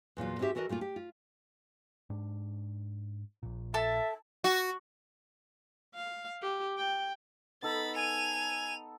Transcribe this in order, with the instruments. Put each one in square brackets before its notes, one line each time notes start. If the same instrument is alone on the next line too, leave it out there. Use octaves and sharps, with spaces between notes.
[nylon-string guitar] E2 A#2 F#3 F4
G#2 C4 D4 F#4 G4 E5
E3 F#4 A4 A#4 D#5
A#2 A3 A#3 F4
G4
F4
[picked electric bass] G#2 D4
A#1 A#2
[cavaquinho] A4 A5 [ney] E5
[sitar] F#4
[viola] F5
G4
G5
[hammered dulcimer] B3 D#4 A4 [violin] B5 A6
[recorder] G#5 [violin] D#7 F7